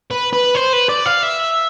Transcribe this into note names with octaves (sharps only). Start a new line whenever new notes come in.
B4
B4
C5
B4
D5
F5
E5